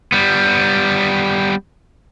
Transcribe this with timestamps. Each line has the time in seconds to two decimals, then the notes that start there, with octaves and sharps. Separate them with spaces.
0.12 G3 B3